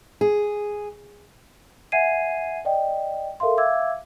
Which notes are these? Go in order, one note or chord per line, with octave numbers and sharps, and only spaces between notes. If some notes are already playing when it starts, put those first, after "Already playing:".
G#4
E5 F#5 G#5 G#6 C7 D#7
D5 D#5 G5
A4 A#4 E5 F5 C6
E5 F5 D6 E6 G#6